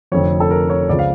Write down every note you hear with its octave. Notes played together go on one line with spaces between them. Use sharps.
F1 F2 D3 F3 C#5
A4
A#4
C#5
C#2 C#3 F3 D5
F5